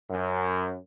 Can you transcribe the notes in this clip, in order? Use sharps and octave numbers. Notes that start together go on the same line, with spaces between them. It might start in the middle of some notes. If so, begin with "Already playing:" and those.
F#2